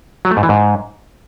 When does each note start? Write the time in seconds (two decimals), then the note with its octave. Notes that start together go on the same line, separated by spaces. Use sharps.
0.25 F#3
0.31 A3
0.37 G#2
0.43 E3
0.49 G#2